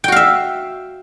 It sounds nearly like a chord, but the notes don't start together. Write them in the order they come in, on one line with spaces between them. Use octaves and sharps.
G5 F#4 F5 E5